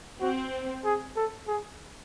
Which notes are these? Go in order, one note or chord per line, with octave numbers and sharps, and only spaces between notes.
C4 F#4
G#4
A4
G#4